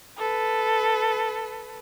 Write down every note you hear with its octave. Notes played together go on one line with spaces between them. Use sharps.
A4 B4